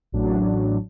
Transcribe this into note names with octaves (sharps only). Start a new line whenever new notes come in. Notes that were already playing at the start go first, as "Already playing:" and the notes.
A1 A2 F#3 D4